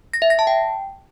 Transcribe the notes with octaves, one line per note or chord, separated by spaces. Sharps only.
A#6
E5
A#6
A5
G5